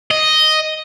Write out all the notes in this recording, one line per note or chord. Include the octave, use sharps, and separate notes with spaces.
D#5